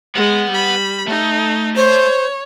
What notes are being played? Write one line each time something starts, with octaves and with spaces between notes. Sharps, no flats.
G#3 B3 F#5
G3 B5
A3 D#4
C5 C#5